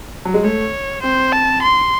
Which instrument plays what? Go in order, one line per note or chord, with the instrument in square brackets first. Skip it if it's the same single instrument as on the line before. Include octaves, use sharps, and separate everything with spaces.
[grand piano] F#3
G#3
[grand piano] A3 [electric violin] C#5
[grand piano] C4 [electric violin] C5
[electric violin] A5
C6